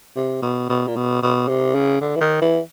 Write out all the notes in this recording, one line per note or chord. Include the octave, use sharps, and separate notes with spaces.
C3
B2
B2
A#2
B2
B2
C3
C#3
D3
E3
D#3
E3